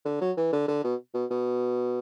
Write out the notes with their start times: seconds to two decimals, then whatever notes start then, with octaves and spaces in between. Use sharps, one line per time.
0.05 D3
0.21 F#3
0.37 E3
0.52 D3
0.68 D3
0.84 B2
1.14 B2
1.30 B2